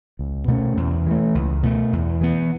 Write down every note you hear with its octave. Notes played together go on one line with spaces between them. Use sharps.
C#2
B2 A3 C#4
E2
E3 A3
C#2
B2 A3
E2
E3 B3